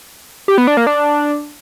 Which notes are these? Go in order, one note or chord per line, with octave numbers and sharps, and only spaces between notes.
G4
B3
D4
A#3
D4